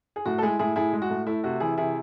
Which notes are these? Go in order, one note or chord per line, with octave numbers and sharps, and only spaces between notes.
G#4
A2 F#4
A4
G#3 E4 G#4
A2 E4 G#4
A2 E4 G#4
G#3
F#4
A2
A3 E4
C3 F#4
E3 E4 G#4
C3 E4 G#4